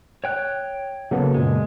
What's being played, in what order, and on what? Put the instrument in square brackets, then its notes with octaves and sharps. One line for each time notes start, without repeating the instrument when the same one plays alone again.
[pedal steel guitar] C#5 G5 F#6
[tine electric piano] C#3 B3 [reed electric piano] F#3 A#3 A4
[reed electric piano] F#2 A#2 [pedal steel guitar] G#3